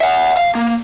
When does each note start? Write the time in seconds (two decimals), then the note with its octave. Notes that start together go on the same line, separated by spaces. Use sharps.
0.01 E5 F#5
0.37 F5
0.55 A#3